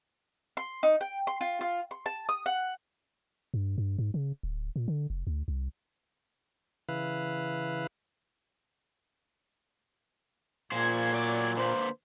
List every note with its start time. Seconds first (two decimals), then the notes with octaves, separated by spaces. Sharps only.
0.57 C6
0.83 D#4
1.01 G5
1.27 C6
1.41 F4
1.61 F4
1.91 C6
2.06 A5
2.29 D#6
2.46 F#5
3.54 G2
3.78 G2
3.98 G#2
4.14 C#3
4.43 D1
4.76 A#2
4.88 D3
5.10 F1
5.27 D2
5.48 C2
6.89 C#3 E3 E4 B4 F5 F#6
10.72 A#2 F4 G#4 C5 G#6
11.13 F#3 D5
11.57 D3 A#3 B4 C5